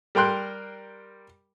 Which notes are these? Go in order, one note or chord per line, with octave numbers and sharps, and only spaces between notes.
G3 A#4 G5 C6 F#6